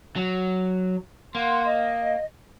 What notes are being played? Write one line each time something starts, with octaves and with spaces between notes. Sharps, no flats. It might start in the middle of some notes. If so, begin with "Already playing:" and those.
F#3
A#3 F#5 C6
D#5